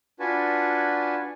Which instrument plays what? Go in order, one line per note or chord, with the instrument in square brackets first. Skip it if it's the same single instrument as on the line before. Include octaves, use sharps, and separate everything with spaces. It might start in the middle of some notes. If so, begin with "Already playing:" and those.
[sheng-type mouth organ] D4 F4 F#4 B4 G#5 A5